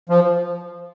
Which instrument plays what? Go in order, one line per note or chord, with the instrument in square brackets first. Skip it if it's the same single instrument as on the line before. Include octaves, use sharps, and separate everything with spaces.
[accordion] F3